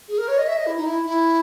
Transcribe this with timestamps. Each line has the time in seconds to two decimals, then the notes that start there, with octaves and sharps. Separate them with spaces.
0.08 G#4
0.18 A#4
0.28 C#5
0.38 D#5
0.47 E5
0.57 D#5
0.66 E4
0.77 D#4
0.86 E4
1.05 E4